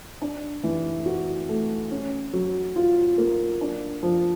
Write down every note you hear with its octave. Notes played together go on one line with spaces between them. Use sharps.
D4
E3
F#4
A3
C#4
F#3
F4
A#3
D4
F3